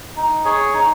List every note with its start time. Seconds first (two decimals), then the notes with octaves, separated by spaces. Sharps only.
0.16 D#4
0.45 G#4 C#5 G#5
0.73 D#4